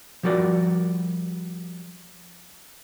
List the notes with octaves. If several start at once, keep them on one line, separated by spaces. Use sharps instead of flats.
F3 G3 F#4 A#4 D5